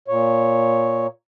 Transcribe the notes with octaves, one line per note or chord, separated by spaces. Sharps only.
A#2 C#5